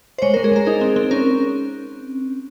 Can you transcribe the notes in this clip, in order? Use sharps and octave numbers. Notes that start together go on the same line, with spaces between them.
C5
G#3 C#5
A#4
G#3
G#4
G#3 A#4
D#4 G#4
C4
C4
C#4 A#4